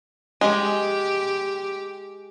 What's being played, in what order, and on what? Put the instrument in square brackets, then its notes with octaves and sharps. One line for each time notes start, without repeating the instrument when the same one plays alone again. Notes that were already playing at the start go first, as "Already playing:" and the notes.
[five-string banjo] G#3 [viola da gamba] G4